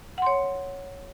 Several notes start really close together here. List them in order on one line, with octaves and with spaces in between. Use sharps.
F#5 C6 C#5